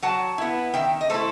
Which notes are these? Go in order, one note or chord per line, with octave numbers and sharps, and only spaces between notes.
F#3 F#5 A5
B3 E4
D#3 E5 G5
D#5
A3 E4 A4 C5